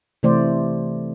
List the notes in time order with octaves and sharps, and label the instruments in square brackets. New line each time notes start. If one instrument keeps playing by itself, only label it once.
[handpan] C3 E3 A3 C5 D5